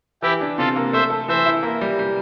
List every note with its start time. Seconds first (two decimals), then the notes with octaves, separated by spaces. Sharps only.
0.22 E3 E4 G4
0.41 D4
0.58 C3 F4 A4
0.76 A#3
0.93 A3 C5 E5
1.10 A4
1.28 E3 C5 E5
1.46 E4
1.63 A#3
1.81 G3
1.99 G3